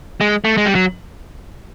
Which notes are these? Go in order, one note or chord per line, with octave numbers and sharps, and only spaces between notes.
G#3
A3
G#3
G3
F#3